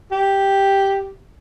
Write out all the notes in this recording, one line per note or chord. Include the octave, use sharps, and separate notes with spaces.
G4